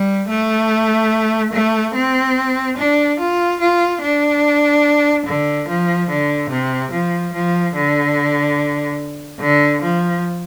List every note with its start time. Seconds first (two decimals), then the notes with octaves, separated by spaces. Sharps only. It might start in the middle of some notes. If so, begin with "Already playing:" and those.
Already playing: G3
0.30 A3
1.53 A3
1.95 C4
2.78 D4
3.20 F4
3.60 F4
4.02 D4
5.26 D3
5.68 F3
6.09 D3
6.50 C3
6.92 F3
7.34 F3
7.75 D3
9.41 D3
9.82 F3